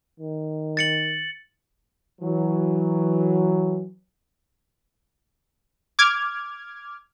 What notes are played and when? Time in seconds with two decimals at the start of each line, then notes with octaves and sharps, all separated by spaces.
0.20 D#3
0.77 A6 C#7 F#7
2.21 E3 F#3
5.99 D6 F6 G#6